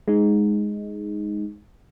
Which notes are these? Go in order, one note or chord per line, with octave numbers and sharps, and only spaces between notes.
G#3 D#4